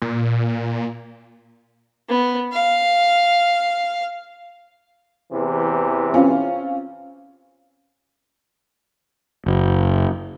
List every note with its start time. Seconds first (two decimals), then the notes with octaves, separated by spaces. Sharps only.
0.02 A#2
2.09 B3
2.53 F5
5.31 E2 C3 E3
6.13 C4 C#4 F4
9.46 F#1